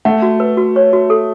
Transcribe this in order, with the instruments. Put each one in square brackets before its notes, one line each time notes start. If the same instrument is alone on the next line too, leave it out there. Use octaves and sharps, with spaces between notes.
[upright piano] A3 [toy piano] F#5
[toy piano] F#4
B4
F#4
C#5
F#4
A4